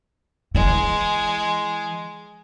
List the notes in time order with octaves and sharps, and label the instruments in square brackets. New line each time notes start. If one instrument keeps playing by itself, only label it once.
[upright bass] E3 [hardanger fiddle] G#3